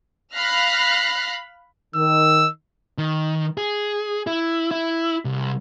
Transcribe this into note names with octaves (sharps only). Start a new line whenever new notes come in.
F5 B5 F6 F#6 A#6 C7
D#3 E6
D#3
G#4
E4
E4
C2